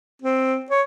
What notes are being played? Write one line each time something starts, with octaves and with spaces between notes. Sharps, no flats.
C4
C#5